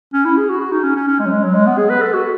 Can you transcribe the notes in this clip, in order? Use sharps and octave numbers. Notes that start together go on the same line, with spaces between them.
C#4
E4
G#4
F#4
F#4
D#4
C#4
C#4
C#4
G#3
F#3
G#3
F#3
G#3
B3
G#4
B4
A4
F#4